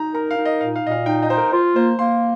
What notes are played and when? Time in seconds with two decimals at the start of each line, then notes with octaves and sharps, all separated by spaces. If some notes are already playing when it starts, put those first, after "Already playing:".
Already playing: D#4 A#5
0.15 A#4 A#5
0.31 F5
0.38 D#4
0.45 D#5
0.61 A#2 F5
0.76 F5
0.84 A#2 D#5
0.91 F5
1.06 D#4 G5
1.23 D#5
1.30 D#4 C5
1.37 A#4
1.52 F4 C5
1.75 A#3 C5
1.99 A#3 C6